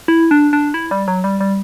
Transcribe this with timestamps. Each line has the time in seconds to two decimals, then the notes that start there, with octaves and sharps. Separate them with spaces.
0.08 E4
0.31 D4
0.53 D4
0.74 E4
0.91 G3
1.08 F#3
1.24 G3
1.40 G3